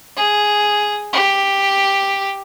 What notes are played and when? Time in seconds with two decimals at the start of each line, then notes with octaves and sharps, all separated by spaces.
0.17 G#4
1.13 G4